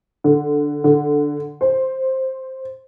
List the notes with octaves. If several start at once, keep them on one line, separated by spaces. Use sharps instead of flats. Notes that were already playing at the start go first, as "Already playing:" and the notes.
D3
D3
C5